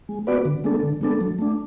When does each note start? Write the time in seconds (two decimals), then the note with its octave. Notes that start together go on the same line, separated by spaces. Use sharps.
0.09 G#3
0.27 B3 F#4 B4 D5
0.45 D3
0.64 G#3 B3 D4 A4
0.83 D3
1.01 G#3 B3 D4 A4
1.21 F#3
1.39 A3 D4